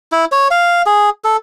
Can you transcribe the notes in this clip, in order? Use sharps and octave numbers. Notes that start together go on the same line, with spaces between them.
E4
C#5
F5
G#4
A4